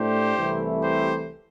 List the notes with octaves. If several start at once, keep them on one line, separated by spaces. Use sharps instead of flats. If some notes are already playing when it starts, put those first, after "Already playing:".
Already playing: A2 A3 D4 G4 C5
C2 C3 E3 A3 E4
G4 C5